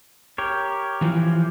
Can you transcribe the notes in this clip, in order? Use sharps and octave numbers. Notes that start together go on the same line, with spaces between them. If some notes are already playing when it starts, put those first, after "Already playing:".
G4 A#4 C#5
E3 F3